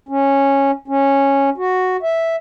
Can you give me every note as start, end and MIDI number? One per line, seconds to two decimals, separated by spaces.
0.09 0.71 61
0.88 1.50 61
1.58 1.97 66
2.03 2.36 76